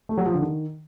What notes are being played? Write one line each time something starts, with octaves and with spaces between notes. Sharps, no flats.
A3
F#3
F3
D3
D#3